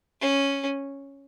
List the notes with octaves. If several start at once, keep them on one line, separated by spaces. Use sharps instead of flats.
C#4